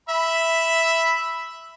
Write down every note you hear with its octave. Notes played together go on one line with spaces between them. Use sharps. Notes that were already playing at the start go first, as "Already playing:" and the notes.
E5 B5